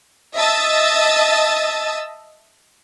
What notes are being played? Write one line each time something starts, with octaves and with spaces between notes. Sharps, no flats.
D#5 E5 A5 D#6 E6 A6